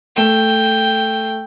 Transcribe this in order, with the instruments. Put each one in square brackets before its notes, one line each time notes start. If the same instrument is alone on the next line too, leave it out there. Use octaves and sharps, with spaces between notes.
[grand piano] A3 E7 [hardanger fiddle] G5